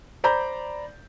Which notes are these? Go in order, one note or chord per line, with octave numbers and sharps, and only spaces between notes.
C5 D5 A#5 B5 G6